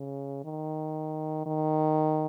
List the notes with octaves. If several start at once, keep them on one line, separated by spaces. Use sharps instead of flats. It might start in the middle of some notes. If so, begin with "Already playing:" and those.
Already playing: C#3
D#3
D#3